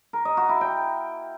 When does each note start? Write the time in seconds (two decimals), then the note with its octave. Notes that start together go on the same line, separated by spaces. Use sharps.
0.13 A#4
0.25 D#5
0.37 F#4
0.49 E4
0.61 G5